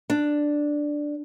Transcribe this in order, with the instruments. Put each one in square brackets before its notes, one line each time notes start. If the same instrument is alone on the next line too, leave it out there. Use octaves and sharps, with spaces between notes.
[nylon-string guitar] D4